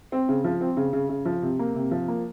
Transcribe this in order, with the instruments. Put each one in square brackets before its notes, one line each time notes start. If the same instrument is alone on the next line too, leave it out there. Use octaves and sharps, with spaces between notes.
[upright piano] C4
C#3
F3
C4
C#3
C#3
C#3
F3
C3
A#3
C3
F3
A#3